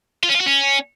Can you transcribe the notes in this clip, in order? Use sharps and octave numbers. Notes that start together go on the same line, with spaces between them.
F4
C#4
F4
F#4
C#4